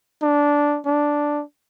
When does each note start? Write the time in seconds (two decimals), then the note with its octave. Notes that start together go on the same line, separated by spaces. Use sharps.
0.22 D4
0.86 D4